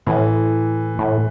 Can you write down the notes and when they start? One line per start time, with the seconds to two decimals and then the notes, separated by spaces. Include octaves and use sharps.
0.07 A2 E3
0.99 A2